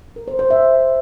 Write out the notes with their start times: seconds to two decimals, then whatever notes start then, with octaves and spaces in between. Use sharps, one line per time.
0.16 A#4
0.28 C5
0.39 C5
0.50 E5